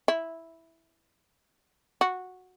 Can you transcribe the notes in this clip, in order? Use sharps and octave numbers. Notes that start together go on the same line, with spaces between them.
E4
F#4